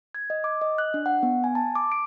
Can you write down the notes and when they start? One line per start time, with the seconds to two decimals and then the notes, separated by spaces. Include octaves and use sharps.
0.15 G#6
0.30 D#5
0.44 D6
0.61 D#5
0.78 F#6
0.94 D4
1.06 F#5
1.23 B3
1.44 G#5
1.55 A5
1.76 D6
1.92 D7